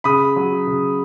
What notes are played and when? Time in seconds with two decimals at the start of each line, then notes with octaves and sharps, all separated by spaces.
0.04 C#3 B5 D#6
0.36 F#3
0.67 C#3